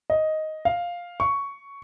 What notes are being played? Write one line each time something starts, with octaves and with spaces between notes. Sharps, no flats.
D#5
F5
C#6